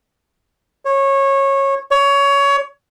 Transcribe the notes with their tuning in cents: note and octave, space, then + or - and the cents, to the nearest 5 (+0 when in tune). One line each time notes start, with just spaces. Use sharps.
C#5 -20
C#5 +20